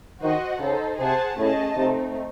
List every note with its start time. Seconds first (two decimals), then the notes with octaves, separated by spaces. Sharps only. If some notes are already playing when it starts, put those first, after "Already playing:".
0.21 D#3 F#4 C5 D#5 F#5
0.60 C#3 D#4 A4 C5
0.98 C3 G#4 C5 F#5 A5
1.37 A2 A3 C#4 G#4 D#5 A5
1.76 C3 A3 C4 D#4